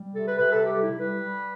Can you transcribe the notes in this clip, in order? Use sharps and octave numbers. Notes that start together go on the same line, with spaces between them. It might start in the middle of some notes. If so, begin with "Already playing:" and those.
Already playing: G3
C3 A4
B4
C3 B4
A4
G3 G4
E4
G3
B4
G3